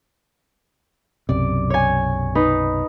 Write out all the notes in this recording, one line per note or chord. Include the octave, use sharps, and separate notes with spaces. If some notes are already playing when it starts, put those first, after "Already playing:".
B1 F#2 C3 D5
C#5 G#5
D#4 B4